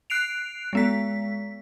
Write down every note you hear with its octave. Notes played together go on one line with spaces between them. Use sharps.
F#6 C7 D7 F7
G#3 B3 B6